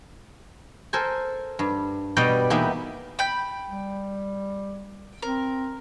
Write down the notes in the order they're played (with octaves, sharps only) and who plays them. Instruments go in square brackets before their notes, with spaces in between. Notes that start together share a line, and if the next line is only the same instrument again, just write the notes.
[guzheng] A4 A#4 C5 G#5
G2
B2 G3 G4 D5 D#5 G5
E2 A#3 B3 D#4 G4 E5
[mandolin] G5 B5 G6
[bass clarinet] G3
[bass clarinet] C4 [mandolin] A#4